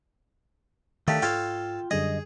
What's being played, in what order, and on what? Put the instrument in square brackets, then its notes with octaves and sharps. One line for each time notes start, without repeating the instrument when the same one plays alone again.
[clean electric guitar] D#3 [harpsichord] A3 D4 G4 [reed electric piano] F5 A5
[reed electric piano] G#2 F6 [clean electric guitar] F4 G5 [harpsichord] A4 C#5 F5
[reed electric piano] F#2 D3 G3 [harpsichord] G#4 [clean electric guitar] D#5